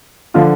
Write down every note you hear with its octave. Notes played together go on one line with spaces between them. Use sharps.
D3 F3 F4